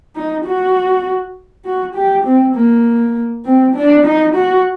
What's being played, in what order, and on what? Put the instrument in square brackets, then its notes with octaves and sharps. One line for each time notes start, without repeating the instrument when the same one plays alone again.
[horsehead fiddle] D#4
F#4
F#4
G4
C4
A#3
C4
D4
D#4
F#4